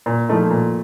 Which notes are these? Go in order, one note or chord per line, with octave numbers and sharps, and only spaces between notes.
A#2
F3 A3 D#4
A#2